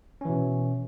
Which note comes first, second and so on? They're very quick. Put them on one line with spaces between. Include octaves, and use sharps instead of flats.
C#4 E3 B2